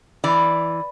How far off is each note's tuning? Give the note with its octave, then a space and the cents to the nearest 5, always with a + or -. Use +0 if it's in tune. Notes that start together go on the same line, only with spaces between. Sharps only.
E3 +0 D5 +0